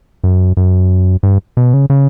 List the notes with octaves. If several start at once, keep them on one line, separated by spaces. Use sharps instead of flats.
F#2
F#2
G2
B2
C#3
C#3